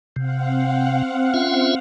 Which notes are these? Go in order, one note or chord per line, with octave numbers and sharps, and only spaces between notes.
C3 C4 F5 F#5
C#4 F4 E5